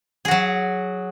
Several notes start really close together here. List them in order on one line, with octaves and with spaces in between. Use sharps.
G#4 F#4 F#3